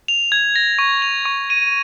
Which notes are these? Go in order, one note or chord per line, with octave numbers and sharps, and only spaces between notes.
F7
G#6
A#6
C#6
F7
C#6
D#7